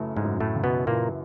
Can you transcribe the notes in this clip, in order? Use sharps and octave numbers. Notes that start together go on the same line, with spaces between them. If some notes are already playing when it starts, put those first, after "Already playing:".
Already playing: F#2 C#3 E3 A3
G#2 G#3
F#2
A2 A3
C#3
B2 B3
A#2 E3 A#3